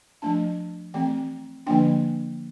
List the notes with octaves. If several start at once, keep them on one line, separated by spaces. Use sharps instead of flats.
F3 A3 D4 A5
E3 A3 C4 G5
D3 F3 A#3 D4 G5